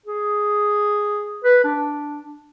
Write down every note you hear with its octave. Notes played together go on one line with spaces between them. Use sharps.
G#4
B4
D4